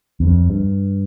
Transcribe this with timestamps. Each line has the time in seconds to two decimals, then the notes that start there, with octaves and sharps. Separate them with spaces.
0.20 E2
0.27 F2
0.50 G2